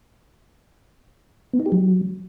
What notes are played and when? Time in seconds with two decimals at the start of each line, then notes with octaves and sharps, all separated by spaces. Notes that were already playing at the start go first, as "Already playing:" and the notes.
1.53 B3
1.60 D#4
1.66 G4
1.72 F#3